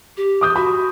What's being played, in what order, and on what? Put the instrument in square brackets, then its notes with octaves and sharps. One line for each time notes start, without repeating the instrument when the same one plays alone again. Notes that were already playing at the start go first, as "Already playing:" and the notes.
[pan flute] G4
[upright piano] D6 D#6 G6
[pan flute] F#4 [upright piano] B5